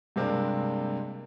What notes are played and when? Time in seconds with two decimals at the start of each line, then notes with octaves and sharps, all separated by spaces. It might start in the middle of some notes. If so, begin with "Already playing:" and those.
0.16 G2 C3 G#3 A#3 C4 D4